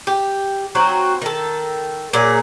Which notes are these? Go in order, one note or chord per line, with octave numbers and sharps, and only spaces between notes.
G4
F#3 C4 D#4 F#4
D#3 A4
A#2 F#3 A#3 G#4